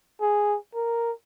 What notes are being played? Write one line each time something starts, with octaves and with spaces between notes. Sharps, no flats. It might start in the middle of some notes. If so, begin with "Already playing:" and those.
G#4
A#4